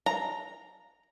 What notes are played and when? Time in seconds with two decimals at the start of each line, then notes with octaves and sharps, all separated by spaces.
0.06 A#5